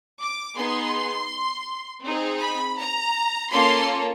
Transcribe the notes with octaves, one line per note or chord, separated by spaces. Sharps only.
D6
B3 D#4 G#4 C6
C4 D#4 G#4
B5
A#5
A#3 C#4 F4 A4 C6